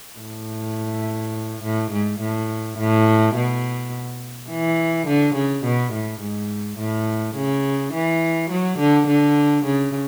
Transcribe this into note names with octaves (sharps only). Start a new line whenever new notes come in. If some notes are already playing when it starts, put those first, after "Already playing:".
A2
A2
G#2
A2
A2
B2
E3
D3
C#3
B2
A2
G#2
A2
C#3
E3
F#3
D3
D3
C#3